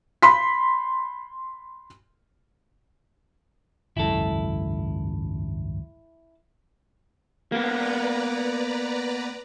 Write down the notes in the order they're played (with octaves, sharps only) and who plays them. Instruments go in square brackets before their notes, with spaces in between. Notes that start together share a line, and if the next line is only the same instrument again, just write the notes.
[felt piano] B5 C6 B6
[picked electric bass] G#1 C#2 F#2 [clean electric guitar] E4 A4
[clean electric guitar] A#3 B3 [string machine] B4 D5 A#5